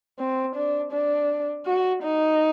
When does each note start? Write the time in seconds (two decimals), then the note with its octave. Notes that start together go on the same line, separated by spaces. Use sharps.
0.19 C4
0.55 D4
0.92 D4
1.66 F#4
2.03 D#4